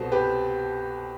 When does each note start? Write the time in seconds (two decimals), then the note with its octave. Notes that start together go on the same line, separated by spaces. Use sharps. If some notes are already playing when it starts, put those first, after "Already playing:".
Already playing: C2 B2 A4 C5
0.12 G4 B4